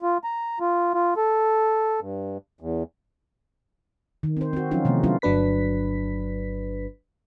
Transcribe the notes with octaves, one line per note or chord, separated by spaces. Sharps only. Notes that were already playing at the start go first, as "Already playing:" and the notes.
F4
A#5
F4
F4
A4
G2
E2
D#3
C4 C5
C4 F#4
F3 F#3 C#4 D#4 F4 F#4
C3 D#3 E3 A3 B3
F#3 G3 C#4 D4 E4 F4
G1 F#3 D4 B4 B6